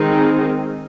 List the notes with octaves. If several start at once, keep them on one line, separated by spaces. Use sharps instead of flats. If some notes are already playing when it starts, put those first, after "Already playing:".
Already playing: D#3 G#3 C4 D#4